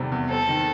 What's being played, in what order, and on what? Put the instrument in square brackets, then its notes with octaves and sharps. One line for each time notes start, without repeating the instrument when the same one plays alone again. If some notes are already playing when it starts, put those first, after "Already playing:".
Already playing: [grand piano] E2 C3 D#3 G3
E2
[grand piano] C4 [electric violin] A4
[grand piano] D#3